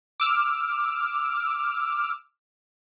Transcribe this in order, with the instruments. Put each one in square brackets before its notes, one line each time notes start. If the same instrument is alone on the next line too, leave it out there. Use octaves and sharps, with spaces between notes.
[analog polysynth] D6 E6 F6